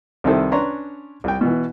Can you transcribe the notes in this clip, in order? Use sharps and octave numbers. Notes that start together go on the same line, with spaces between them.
C2 C3 D#3 E4 A4 C5
C#4 D4 B4 C#5 A#5 C6
C2 G5
B2 E3